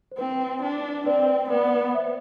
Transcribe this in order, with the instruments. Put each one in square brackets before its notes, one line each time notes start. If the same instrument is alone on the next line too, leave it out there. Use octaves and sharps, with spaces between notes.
[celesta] C5
[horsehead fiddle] C4 [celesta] B4
[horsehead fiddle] D4
[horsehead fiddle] C4 [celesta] B4 D5
[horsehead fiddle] B3 [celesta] B4 D5
[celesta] C5 E5